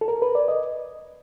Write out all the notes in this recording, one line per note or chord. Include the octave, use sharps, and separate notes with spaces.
A4
A#4
B4
D5
D#5